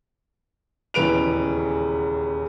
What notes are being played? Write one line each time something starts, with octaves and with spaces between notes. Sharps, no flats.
D#1 E2 C#3 B4 D7 F7